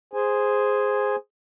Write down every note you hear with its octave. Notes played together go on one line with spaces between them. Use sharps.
G#4 C5 G#5